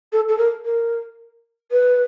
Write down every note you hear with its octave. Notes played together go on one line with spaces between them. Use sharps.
A4
A4
A#4
A#4
B4